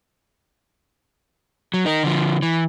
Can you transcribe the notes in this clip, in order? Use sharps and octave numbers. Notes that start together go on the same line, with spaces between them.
F#3
D#4 A#4
D3 F3
E3